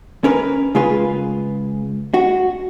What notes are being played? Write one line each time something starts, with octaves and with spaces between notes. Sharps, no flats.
C#4 A#4 B4
C#3 G#3 F4 G#4 B4
F#4